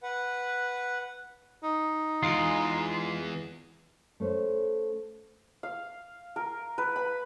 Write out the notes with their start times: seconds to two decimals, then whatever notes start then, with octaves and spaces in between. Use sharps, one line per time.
0.03 B4 F#5
1.63 D#4
2.23 E2 G#3 F4
4.20 A3 C#4 C5
5.63 F5
6.36 A#4
6.78 B4
6.96 B5